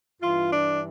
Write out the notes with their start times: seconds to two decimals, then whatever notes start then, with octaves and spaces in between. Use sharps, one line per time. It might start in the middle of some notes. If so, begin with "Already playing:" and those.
0.21 G2 E3 F4
0.53 D4